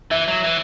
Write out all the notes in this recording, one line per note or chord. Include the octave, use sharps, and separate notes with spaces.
E3 E5
F#3
E3